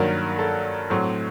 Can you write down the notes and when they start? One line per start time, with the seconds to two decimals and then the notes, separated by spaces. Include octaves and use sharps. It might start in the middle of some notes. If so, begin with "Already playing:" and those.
Already playing: G2 D#3 F#3 A#3 A#4
0.39 A4
0.90 A2 F#3 C4